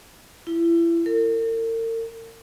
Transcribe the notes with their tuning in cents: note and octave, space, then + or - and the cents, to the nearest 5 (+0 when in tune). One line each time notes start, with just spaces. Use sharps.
E4 +30
A#4 -45